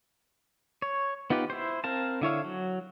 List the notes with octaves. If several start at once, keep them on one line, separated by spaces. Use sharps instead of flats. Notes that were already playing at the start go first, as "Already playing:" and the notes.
C#5
B3 D#4 F4 G4 B4
E4 C5
C4 A#4 F5 A5
D3 E4 C#5 F5
F#3